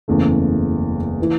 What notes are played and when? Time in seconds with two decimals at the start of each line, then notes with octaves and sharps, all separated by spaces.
0.08 F#1 E2 C#3 A3
1.22 E3